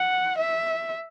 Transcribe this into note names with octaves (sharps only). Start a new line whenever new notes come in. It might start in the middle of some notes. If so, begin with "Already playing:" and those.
Already playing: F#5
E5